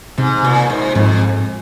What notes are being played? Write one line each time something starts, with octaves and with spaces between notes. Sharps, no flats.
G#2 C3
A#2
G#2
F2 G#2